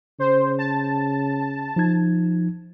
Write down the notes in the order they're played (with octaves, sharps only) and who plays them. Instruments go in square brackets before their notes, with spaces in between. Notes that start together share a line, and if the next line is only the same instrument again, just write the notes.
[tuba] C#3 [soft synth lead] C5
[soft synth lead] A5
[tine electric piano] F3 D#4 G#6